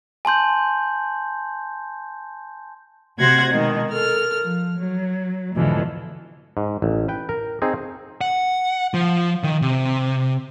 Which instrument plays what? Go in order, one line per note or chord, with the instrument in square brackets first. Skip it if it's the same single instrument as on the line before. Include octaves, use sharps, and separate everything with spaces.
[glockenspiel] G#5 A5 C6 G6
[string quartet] C3 F#4 C5 F#5 G#6 A#6
B2 D#3 G#3 D#4
A4 A#4 F6
F3
F#3
E2 G#2 B2 D3 E3 F3
[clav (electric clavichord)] G#2
A1
B4 G5
A#4
C4 D#4 G#4
[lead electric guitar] F#5
F3
D#3
C3